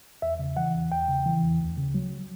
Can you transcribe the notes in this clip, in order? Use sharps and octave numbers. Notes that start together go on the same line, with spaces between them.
E2 E5
C#3
E3 F#5
E2
E2 G5
C#3
E3
E2
D2
C#3
F#3